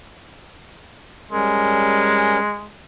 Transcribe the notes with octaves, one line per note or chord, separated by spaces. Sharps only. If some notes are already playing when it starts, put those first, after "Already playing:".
G3 G#3 C#4 A#4